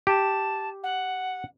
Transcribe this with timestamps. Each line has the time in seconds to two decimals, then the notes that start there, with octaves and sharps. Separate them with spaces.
0.07 G4 A5
0.83 F#5